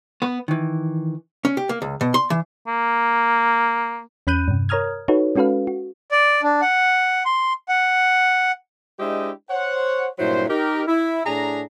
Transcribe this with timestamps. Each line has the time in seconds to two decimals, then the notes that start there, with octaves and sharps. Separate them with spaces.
0.22 B3 B4
0.48 D#3 E3
1.45 C#4
1.57 G4
1.69 A#3
1.82 C#2
2.01 B2
2.14 C6
2.30 E3
2.68 A#3
4.27 E2 C#4 B5 F#6 G6 D#7
4.48 G2 C3
4.69 A#4 C#5 A#5 D#6 F6 G#6
5.08 D#4 F#4 A4 B4 C#5
5.36 G#3 C#4 F#4 A4 B4 F5
5.67 F#4
6.11 D5
6.43 D4
6.62 F#5
7.26 C6
7.69 F#5
8.99 G#3 D4 E4 G4 C5 D#5
9.50 C5 C#5 F#5
10.19 G2 A#2 F#3 E4 C5
10.49 D#4 G4 A#4
10.87 E4
11.25 A2 D4 G#4 A#5